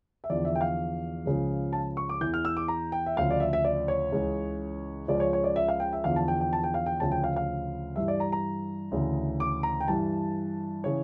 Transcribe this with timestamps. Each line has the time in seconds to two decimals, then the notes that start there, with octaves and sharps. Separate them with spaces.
0.24 E5
0.30 E2 D3 F3 D5
0.45 E5
0.55 G5
0.61 F5
1.25 C#2 C#3 F3
1.73 A5
1.97 C#6
2.09 D6
2.21 E2 E3 G6
2.34 F6
2.45 E6
2.57 D6
2.68 A#5
2.92 G5
3.06 E5
3.17 D2 C#3 F3 F5
3.31 D5
3.40 E5
3.53 E5
3.65 D5
3.88 C#5
4.12 C#2 C#3 E3
5.08 C#2 C#3 F3 D5
5.20 C#5
5.33 C#5
5.44 D5
5.56 E5
5.68 F5
5.80 G5
5.93 E5
6.04 E2 D3 F3 F5
6.16 A5
6.28 G5
6.41 G5
6.53 A5
6.64 G5
6.74 F5
6.86 G5
7.00 D2 C#3 F3 A5
7.12 G5
7.24 F5
7.36 F5
7.96 G2 E3 E5
8.08 D5
8.20 A#5
8.32 A#5
8.91 D2 C#3 E3
9.40 D6
9.63 A#5
9.81 G5
9.88 G2 E3 A5
10.84 C#3 E3 C#5